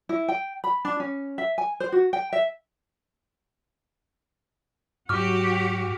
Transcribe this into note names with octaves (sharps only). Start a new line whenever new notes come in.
E4
G5
B5
D4
C#4
E5
G#5
C5
F#4
G5
E5
G#2 F#3 F#4 G4 C#6 D6 F6